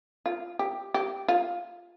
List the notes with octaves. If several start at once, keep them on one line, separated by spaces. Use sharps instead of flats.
F4
G4
G4
F4